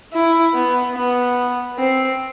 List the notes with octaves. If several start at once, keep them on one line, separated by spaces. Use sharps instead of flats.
E4
B3
B3
C4